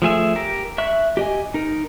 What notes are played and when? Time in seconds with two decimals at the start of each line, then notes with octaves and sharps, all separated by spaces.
0.02 F3 A3 G#4 E5
0.35 G4 A#4
0.78 E5 C#6 F#6
1.17 G4 D#5 G#5
1.54 D#4 A#4